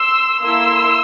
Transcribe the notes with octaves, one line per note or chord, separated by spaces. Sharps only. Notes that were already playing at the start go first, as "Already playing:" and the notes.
Already playing: C6 E6
A#3 E4 A4 C6 E6